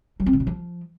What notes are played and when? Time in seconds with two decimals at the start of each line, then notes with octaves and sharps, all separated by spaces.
0.20 F#3
0.26 C4
0.33 D3
0.40 A#2
0.47 F3